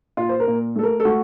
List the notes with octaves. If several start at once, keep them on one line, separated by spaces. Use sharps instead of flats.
A#2 F4
C5
A#4
A#2
A3 A4
A#4
A4
A3 F#4